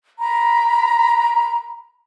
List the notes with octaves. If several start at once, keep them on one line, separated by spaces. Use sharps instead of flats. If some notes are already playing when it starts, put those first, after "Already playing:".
A#5 B5